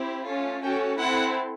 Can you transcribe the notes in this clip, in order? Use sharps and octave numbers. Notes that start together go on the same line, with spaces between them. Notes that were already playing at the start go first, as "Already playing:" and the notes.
Already playing: C4 E4 G4
A3 C#4 F4 A4
A3 C#4 F#4 A4 G5
C4 E4 A4 F#5